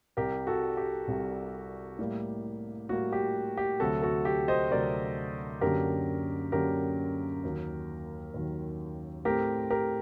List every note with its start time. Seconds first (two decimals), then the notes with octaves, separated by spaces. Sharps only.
0.17 C2 C3 G3 G4 A#4
0.47 F#4 A4
0.77 G4
1.08 C2 C3 G3
1.99 A2 G3 A#3
2.89 A2 G3 A#3 F#4
3.12 G4
3.57 G4
3.80 D2 C3 F#3 C4 F#4 A4
4.02 F#4 A4
4.25 G4
4.48 C5 D#5
4.71 D2 C3 F#3 C4 A#4 D5
5.61 F#2 D3 F#3 A#3 G4 A#4
6.52 F#2 D3 F#3 A#3 G4 A#4
7.44 D#2 D#3 F#3
8.34 D#2 D#3 F#3
9.25 A2 A3 C4 G4 A#4
9.70 G4 A#4